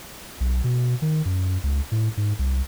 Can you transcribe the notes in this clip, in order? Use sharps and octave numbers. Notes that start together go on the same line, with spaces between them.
B1
B2
D#3
F#2
C#2
A2
G#2
C2